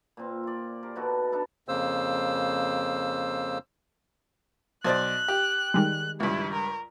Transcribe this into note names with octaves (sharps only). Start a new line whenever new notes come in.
A#2 C4
F4 D5
G4 A#4 C5
B2 D#4 F#4 A4
D4 D#4 A4 B5
F2 C#3 A#3 C5 E6
B1 C5 D5 F#6
G4
D#3 G3 G#3
C#2 G2 E4
A#4